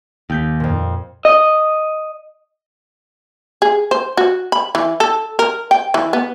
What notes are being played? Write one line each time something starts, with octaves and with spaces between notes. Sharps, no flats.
D#2 G4 G6 B6
F2 A#2
D#5
G#4
C5
F#4
B5
E3
A4
A#4
G5
E3
B3